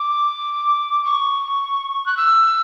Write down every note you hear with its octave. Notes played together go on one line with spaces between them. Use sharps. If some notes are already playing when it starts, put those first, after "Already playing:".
Already playing: D6
C#6
F#6
E6